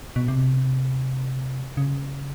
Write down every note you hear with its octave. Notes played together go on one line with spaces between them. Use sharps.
B2
C3
C#3